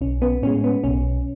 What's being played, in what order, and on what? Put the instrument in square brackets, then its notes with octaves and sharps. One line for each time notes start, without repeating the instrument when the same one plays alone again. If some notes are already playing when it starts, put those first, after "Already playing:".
[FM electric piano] B1 C#4
B3
A2 G#3 C#4
B3
B1 C#4